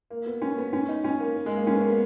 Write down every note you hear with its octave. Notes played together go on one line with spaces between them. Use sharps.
A#3
B3
C#4
B3
C#4
D#4
C#4
A#3
A#3
G#3
A#3
C#4
B3
A#3
B3